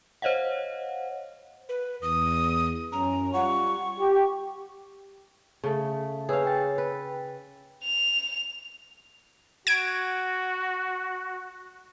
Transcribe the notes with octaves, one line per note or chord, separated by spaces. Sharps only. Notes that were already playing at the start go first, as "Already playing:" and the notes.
C5 C#5 D#5 F5 F#5
B4
E2 D#6
F#2 C#4 A#5
G3 F4 F#5 C#6
G4
C#3 A3
G#4 B4 C#5 F5 E6
G5 A6
B4
F7
F#4 G#6 D7